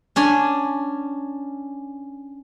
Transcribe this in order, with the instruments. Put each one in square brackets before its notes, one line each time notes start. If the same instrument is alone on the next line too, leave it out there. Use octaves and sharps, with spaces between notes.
[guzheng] C#4 D4 G#5